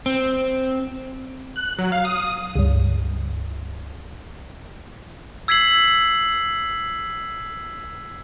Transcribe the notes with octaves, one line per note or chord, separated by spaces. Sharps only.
C4
F#6
F#3
F5
D#6
D#6
C#2 G2
E6 G#6 B6 C7 F#7